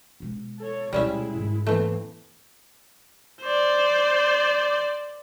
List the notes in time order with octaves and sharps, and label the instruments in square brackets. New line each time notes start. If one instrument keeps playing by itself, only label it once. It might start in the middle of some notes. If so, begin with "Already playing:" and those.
[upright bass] B2 G#3
[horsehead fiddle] A4 C#5
[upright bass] D2 B2 [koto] G3 C#4 E5 [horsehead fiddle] G#3 E4
[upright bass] G#2 D#3
[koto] E3 A3 [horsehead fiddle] A#3 C4
[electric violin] C5 D5